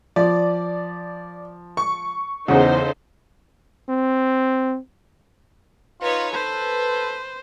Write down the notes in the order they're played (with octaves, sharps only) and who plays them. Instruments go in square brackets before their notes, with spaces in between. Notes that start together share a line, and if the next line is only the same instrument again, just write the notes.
[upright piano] F3 [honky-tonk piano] D5
[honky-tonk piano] C#6
[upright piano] E2 F#5 [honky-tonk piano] C#3 [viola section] D#4 A4 C5
[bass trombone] C4
[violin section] D#4 B4 C#5 [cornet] F4
[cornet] A4 [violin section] B4 [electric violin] C5